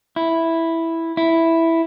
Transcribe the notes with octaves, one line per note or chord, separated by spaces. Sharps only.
E4
E4